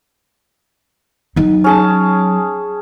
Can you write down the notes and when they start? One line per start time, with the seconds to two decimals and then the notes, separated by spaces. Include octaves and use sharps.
1.36 F#3 D#4
1.64 C#4 G#4 A5